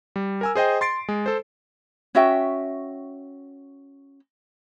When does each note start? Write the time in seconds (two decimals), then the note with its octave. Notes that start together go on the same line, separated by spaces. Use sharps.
0.16 G3
0.41 A#4 G#5 E6
0.55 G#4 C5 D#5 G5
0.81 C6 A6 C7 D7
1.08 G#3
1.26 A4 C5
2.15 C#4 F#4 E5 G5